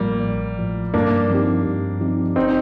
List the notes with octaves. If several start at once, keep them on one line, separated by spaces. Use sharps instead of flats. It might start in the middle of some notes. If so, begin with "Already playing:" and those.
Already playing: A1 A2 F3 G3 A#3
A1
A2 F3
G2 A#3 D4
F3 C4 D#4 G4
G2
F3 C4 D#4 G4
G1 C4 D#4